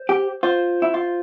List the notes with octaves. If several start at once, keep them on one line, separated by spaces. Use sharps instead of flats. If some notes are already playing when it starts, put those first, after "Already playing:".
Already playing: C5
G4
F4 C5
E4
F4